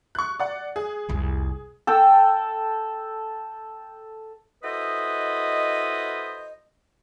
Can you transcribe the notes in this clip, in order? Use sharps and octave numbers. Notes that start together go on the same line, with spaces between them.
C#6 F#6
D5 F#5
G#4
F1 C2
A4 G5 A5 E6
E4 F#4 A4 B4 C5 D#5